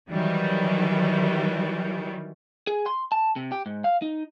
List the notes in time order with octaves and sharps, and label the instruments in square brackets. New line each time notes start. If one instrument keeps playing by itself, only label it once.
[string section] D#3 E3 F#3 G3
[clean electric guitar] G#4
C6
A5
C3
G4
G#2
F5
D#4